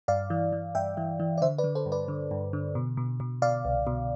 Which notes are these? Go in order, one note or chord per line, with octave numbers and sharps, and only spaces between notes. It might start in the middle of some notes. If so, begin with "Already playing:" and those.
G2 D5 F5
E3
E3
G2 E5 G5
E3
E3
D5
D3 C5 E5
B4 D5
D3
A4 C5
G2
B4 D5
D3
G2
D3
B2
B2
B2
B2 D5 F5
C2
B2